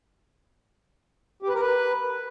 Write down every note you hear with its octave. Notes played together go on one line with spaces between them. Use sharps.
G4
B4
A#4
B4